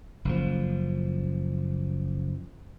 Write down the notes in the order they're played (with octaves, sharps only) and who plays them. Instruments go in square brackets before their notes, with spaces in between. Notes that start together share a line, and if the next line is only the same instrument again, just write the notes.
[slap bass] F#1 F3